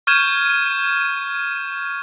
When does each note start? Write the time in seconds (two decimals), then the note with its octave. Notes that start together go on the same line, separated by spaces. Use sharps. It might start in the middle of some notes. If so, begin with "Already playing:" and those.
0.07 C#6 F6 G6 G#6 D#7 E7